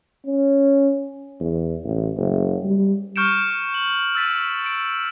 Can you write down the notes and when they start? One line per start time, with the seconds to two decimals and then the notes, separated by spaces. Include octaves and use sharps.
0.26 C#4
1.40 E2
1.84 A1
2.17 F#1
2.64 G3
3.16 C#6 F6 G6 C#7 D7 E7
3.74 F#7
4.15 E6 A6 B6 D#7
4.66 D7